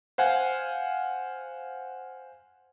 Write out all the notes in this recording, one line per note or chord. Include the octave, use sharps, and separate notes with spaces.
C5 F5 F#5 G#5